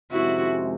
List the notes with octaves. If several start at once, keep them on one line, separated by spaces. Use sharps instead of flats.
F2 C3 D#3 G#3 C#4 E4 F#4